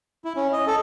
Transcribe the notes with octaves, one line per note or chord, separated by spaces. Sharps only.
E4
C#4
D#5
A4